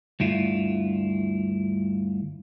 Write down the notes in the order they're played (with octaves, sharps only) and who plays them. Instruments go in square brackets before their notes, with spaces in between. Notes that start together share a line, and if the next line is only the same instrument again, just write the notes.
[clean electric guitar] D2 G2 E4 F4